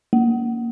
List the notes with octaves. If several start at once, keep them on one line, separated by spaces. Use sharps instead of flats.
A#3